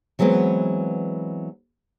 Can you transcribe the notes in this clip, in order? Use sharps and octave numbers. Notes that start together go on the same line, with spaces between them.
E3 F#3 G#3 B3 C4